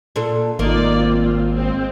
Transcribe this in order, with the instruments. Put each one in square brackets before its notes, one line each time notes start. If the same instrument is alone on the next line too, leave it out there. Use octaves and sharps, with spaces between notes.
[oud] A#2 D4 A4
[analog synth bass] G#1 [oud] A#3 [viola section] D#4 F4 D5
[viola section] C4 F4
G#3 C4